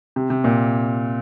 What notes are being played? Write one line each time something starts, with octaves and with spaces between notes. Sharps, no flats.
C3
C3
A#2